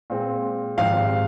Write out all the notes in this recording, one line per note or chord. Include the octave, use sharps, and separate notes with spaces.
A#2 G#3 C4
G#1 G#2 F3 C4 G4 F5